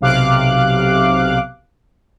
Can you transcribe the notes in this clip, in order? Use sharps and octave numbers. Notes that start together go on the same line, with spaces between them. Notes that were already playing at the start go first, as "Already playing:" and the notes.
B1 C3 F5 D6 F#6